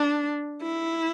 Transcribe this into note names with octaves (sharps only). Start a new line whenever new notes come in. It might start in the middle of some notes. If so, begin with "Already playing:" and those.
Already playing: D4
E4